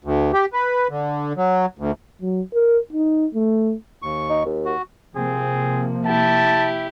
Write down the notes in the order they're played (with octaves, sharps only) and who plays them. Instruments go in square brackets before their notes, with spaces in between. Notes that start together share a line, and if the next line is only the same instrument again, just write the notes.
[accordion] D2
G4
B4
D3
F#3
D2
[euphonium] F#3
A#4
D#4
A3
[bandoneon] D#2 C#6
[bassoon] D#4
D#2
[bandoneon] F#4
[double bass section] C3 F3 A#3 [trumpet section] C4 G#4
[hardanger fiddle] E4 G4 [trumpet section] A5